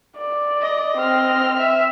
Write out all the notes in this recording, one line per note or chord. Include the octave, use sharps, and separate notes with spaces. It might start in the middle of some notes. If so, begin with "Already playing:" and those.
D5
D#5
C4 F6
E5